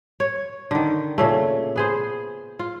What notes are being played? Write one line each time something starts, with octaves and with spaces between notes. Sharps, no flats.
C#5
D3 D#3
A#2 C#3 A3
B3 G#4 C5
F4